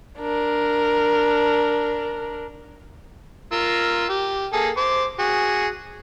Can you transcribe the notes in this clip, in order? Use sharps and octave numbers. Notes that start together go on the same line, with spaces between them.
D4 A#4
F4 A#4 E6
G4
A#3 G#4 A4
C5 D6
F#4 G#4